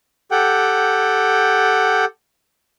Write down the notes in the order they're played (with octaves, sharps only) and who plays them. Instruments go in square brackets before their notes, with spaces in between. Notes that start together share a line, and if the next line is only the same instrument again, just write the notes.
[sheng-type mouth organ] G4 A4 F#5 G5